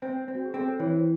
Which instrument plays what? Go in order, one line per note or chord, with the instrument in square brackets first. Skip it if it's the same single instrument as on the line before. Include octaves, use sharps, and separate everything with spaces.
[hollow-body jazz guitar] C4 [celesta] C5
[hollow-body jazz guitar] C4
[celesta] F#4
G#4
[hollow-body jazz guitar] C4 [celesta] A4
[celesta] C5
[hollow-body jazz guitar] E3 [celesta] C#5
[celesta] C5